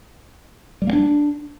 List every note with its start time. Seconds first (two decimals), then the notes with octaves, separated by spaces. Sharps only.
0.82 G3
0.87 A#3
0.93 D4